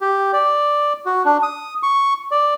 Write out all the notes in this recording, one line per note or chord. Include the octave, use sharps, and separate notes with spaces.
G4
D5
F#4
D4
D#6
C#6
D5